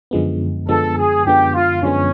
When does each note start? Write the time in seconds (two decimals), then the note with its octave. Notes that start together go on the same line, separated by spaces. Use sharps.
0.11 F#2 D3 F3 G#3 B3
0.69 F#2 D3 F3 G#3 B3 A4
0.97 G#4
1.25 F#2 D3 F3 G#3 B3 G4
1.54 F4
1.83 F#2 D3 F3 G#3 B3 C#4